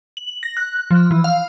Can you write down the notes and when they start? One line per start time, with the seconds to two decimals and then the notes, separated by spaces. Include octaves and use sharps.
0.17 F#7
0.43 A#6
0.57 F#6
0.91 F3
1.11 E3
1.24 F5